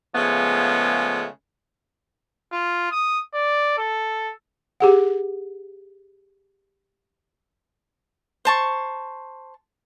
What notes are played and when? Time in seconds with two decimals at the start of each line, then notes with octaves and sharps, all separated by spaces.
0.15 C#3 F3 G#3 A3 B3
2.52 F4
2.92 D#6
3.34 D5
3.78 A4
4.80 G4 G#4 F#5
8.45 C5 A5 C#6